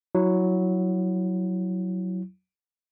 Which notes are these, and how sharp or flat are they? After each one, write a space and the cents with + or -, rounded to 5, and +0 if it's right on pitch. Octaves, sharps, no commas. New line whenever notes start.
F#3 +0 E4 +0